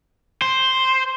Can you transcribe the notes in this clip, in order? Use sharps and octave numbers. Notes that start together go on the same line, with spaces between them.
C5